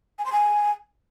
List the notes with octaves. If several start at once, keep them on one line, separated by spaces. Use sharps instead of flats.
G#5
C6
G#5